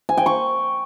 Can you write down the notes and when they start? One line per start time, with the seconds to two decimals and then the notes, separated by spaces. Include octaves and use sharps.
0.09 G#5
0.17 G5
0.26 C#6